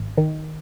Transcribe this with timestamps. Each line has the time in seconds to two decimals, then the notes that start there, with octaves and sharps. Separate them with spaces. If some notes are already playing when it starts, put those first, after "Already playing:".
Already playing: G#1
0.17 D#3